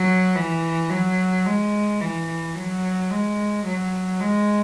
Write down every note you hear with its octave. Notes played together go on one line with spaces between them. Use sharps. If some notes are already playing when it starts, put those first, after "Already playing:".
Already playing: F#3
E3
F#3
G#3
E3
F#3
G#3
F#3
G#3